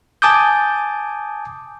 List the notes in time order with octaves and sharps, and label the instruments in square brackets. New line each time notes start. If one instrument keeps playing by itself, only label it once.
[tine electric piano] G#5 A5 D6 D#6 G6